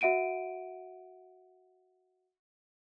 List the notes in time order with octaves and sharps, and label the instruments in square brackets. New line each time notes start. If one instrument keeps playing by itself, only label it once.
[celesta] F#4 E5 F#5 D7 D#7